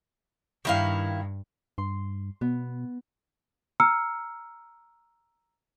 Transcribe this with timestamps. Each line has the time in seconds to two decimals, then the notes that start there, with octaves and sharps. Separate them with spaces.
0.65 G2 D#3 E4 F5
1.78 G2 C6
2.41 B2 B3
3.80 A#5 E6 F6 C#7